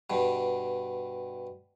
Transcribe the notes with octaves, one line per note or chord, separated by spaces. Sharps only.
G2 B2